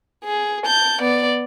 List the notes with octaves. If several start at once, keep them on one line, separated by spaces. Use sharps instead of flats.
G#4
A5 G6
B3 D5